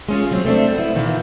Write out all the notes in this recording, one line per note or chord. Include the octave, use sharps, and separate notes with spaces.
G#3 C#4 F4
F#3 C4
A3 C4 D4
B3 E4
A#2 D#3 E3